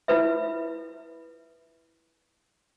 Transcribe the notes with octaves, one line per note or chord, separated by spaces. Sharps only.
E4 F4 B4 E5